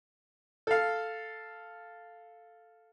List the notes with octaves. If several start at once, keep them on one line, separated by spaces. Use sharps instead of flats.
A4 F5